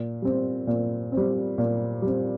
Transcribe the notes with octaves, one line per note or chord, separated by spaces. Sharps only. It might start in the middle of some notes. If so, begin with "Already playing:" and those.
Already playing: A#2
G3 C4
A#2
C4
G3
A#2
G3 C4